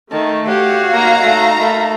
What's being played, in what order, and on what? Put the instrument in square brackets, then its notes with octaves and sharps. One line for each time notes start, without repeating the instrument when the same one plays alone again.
[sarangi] D#3 [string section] A3 [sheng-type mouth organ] A5
[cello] F#4 F5 [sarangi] G4 [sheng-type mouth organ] C#5 F#5
[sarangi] A#3 [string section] D#4 A#5
[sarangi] A3
[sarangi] A3 [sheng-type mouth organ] A#4 B5